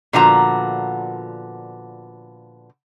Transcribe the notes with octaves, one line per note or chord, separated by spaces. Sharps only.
A#2 D3 F3 B3 F#4 A#5